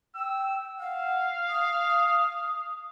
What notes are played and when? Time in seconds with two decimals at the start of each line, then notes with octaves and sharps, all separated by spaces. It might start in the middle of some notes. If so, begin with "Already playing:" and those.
0.15 G5 E6
0.80 F5 F#5
1.49 D#6